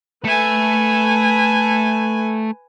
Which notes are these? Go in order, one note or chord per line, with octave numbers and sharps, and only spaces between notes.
A3 B4 E5 G#5